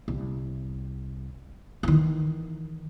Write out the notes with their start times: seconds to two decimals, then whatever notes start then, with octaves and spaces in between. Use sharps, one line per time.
0.08 C2
1.83 D#3 E3